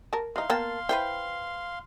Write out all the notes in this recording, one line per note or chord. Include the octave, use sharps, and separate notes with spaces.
A#4 A5
E3 D#4 F5 C6
A#3 B3 G5 A5
E4 B4 C5 G5